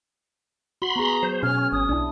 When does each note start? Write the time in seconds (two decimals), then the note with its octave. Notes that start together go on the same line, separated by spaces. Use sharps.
0.82 F#4 B5 C6
0.96 B3 G#4 A#5
1.23 F#3 C5
1.43 B2 C#4 F6
1.72 G#1 D#6
1.89 B1 D4 E4